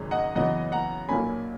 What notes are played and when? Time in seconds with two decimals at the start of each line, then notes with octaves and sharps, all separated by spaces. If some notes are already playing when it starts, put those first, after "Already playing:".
Already playing: G#1 F#2 C#3 G#3 C#4
0.11 D#5 F#5
0.35 F#2 C#3 E3 B3 D#5 F#5
0.72 F#5 A#5
1.09 B1 A#2 A#3 C#4 G#5 B5